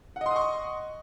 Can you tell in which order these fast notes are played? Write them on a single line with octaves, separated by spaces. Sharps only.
F#5 D#5 C6 D#6 C#6